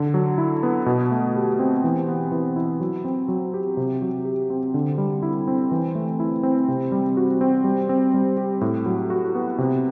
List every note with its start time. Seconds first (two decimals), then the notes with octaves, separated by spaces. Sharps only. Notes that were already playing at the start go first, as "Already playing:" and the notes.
Already playing: D3
0.14 F#3
0.38 E4
0.63 B3
0.86 B2
1.11 A3
1.36 G4
1.59 C4
1.84 E3
2.08 B3
2.32 E3
2.56 E4
2.80 F#3
3.05 C4
3.28 F#3
3.54 G4
3.77 C3
4.02 F#3
4.25 G4
4.50 C4
4.74 D3
4.98 G3
5.22 E4
5.48 C4
5.71 E3
5.95 A3
6.20 E4
6.43 C4
6.68 C3
6.92 G3
7.17 F#4
7.41 C4
7.64 G3
7.89 C4
8.14 G3
8.37 G4
8.61 A2
8.86 F#3
9.10 F#4
9.35 B3
9.58 C3